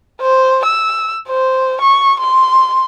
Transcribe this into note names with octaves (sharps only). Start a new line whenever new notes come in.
C5
E6
C5
C#6
C6